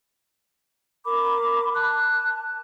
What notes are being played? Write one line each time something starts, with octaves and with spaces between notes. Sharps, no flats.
A#4 B5 D6
A5 F#6